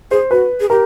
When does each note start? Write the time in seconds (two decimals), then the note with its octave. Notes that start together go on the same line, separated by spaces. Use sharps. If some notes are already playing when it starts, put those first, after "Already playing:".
0.11 G#4 C5
0.31 F#4 B4
0.60 G#4
0.70 G4 A#4